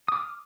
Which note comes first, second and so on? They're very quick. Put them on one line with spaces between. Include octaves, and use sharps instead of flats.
D#6 D6 F6